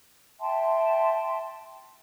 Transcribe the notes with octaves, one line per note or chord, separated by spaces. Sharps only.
E5 G5 A5 C6